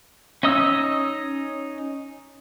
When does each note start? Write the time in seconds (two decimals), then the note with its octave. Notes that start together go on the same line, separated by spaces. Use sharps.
0.43 C#4 D#4 D#5 D#6 E6